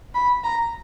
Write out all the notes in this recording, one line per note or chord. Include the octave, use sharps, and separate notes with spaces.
B5
A#5